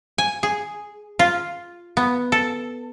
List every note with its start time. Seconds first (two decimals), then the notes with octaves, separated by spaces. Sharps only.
0.18 G#5
0.43 G#4
1.19 F4
1.97 B3
2.32 A4